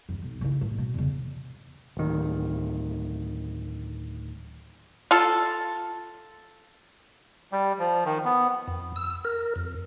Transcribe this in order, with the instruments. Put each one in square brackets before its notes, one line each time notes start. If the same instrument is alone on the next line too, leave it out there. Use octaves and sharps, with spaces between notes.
[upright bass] F2 F4
B1
C#3 E4
A2
B2
E2 C#3
[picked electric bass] D1 D#3
[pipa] F4 A4
[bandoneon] G3
F3
D#3
B3
[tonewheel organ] F2
E6
A#4
F2